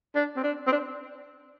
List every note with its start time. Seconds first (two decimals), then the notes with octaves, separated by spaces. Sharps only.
0.15 D4
0.36 C4
0.43 D4
0.67 C4
0.72 D4